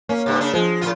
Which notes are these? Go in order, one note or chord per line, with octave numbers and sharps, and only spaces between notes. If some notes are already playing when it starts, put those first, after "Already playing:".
A#3 C#4
G2 C3
C#3 D4
F3 G#3
A2 C3 F4